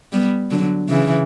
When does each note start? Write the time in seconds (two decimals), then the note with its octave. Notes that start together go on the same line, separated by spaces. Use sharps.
0.12 G3 B3
0.51 D3 F#3
0.89 C#3 E3